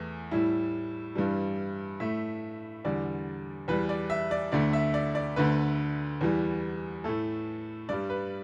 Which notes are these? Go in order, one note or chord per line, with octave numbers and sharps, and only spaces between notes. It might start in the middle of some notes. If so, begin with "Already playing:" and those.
Already playing: E2 E3 A3
A2 G3 E4
G2 E3 G3
A2 A3 E5
E2 D3 G3 D5
E2 E3 G3 B4
D5
E5
D5
D2 D3 A3 D5
E5
D5
D5
D2 D3 A3 B4
E2 E3 G3
A2 A3 A4
G2 G3 D5
B4